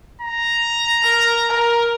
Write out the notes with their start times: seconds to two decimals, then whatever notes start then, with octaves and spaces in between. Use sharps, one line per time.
0.21 A#5
1.03 A#4
1.50 A#4